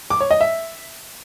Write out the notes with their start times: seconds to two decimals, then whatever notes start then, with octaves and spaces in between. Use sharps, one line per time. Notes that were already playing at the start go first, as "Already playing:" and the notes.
0.10 D6
0.20 C#5
0.31 D#5
0.41 E5